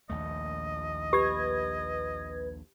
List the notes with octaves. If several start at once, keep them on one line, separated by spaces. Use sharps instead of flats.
A#1 D#2 A3 D#5
G4 B4 G#6